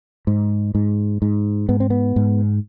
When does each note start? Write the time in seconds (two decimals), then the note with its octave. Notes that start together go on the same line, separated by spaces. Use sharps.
0.27 G#2
0.75 G#2
1.22 G#2
1.69 G#2 B3
1.80 C4
1.90 B3
2.16 G#2